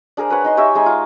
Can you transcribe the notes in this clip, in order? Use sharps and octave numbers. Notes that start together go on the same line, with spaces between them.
D4 G#4 A#4 C5
B4 C#5 F#5
D#4 D#5 C6
G4 C#5 D#5 E5
G#3 D#4 G#5
F4